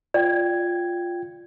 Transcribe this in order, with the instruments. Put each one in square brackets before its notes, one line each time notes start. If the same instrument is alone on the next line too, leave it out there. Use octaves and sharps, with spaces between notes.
[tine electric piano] F4 G5 G#6 [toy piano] D5